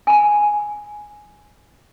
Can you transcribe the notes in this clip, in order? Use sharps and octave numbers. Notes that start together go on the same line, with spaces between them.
G#5 B5